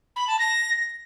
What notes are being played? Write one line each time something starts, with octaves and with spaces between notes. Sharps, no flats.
B5
A5
A#6